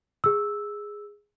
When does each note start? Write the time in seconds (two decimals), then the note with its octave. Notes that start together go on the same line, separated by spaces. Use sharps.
0.24 G#4 E6